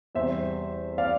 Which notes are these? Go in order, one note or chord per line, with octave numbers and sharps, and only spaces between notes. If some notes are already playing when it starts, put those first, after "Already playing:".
E2 C3 G3 C5 E5
D5 F5